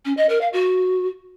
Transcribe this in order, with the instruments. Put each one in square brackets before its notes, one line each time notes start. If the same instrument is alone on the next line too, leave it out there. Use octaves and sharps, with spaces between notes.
[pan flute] C#4
D#5
A#4
F5
F#4